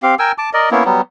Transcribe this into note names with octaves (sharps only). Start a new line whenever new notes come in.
C4 G4 F5
A#4 G5 G#5 E6
A5 D6
A#4 D5 D#5
A#3 B3 C#4 E4
F#3 G3 B3